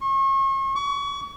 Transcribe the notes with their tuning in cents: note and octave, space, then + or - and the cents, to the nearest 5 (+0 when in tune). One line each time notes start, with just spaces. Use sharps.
C#6 -40
C#6 +35